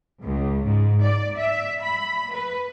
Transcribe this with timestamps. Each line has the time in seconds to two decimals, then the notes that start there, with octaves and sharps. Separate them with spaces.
0.24 C#2
0.68 G#2
1.04 D5
1.39 E5
1.83 B5
2.34 B4